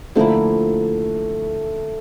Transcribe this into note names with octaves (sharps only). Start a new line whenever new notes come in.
D3 F3 A3 A#3 E4